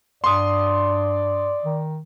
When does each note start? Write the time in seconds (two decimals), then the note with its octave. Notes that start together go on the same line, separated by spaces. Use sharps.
0.24 G2 D5 C6 D#6
1.65 D#3